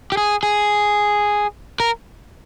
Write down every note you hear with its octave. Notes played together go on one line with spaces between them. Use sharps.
G4
G#4
G#4
A#4